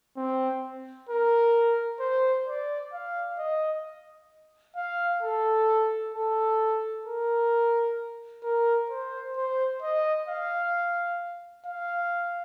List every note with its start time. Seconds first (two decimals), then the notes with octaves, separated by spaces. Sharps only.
0.17 C4
1.09 A#4
2.00 C5
2.47 D5
2.93 F5
3.39 D#5
4.76 F5
5.23 A4
6.15 A4
7.06 A#4
8.43 A#4
8.90 C5
9.36 C5
9.82 D#5
10.29 F5
11.66 F5